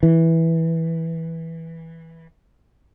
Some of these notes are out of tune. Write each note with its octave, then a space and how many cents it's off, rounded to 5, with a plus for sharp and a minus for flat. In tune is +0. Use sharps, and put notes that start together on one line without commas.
E3 -10